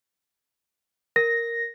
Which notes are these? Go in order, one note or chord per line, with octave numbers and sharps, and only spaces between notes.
A#4 A#6